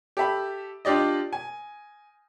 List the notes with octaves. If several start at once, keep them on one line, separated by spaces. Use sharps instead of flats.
G4 A4 E5 B5
D4 F4 G4 D5 D#5
G#5